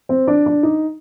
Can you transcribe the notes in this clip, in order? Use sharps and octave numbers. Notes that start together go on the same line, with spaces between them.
C4
D4
D4
D#4